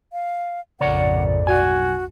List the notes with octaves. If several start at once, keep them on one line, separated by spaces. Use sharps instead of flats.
F5
A#1 F2 G#2 C#3 A#4 C#5 D5 F#5
B1 F#4 G#5